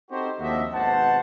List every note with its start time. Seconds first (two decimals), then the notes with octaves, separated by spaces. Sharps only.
0.11 C4 D#4 F#4 G4 A4 C5
0.39 D#2 F3 D4 F#4 D#5 E5
0.72 G#1 B2 C5 F#5 A5